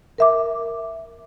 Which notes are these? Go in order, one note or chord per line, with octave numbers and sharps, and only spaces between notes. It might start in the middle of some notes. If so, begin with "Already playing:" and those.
A#4 E5 D6